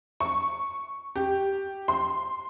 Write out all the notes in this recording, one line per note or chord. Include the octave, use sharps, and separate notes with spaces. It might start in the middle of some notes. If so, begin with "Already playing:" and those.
C#6
G4
C6